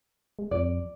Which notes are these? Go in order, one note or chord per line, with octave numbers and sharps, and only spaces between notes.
G#3
F2 D5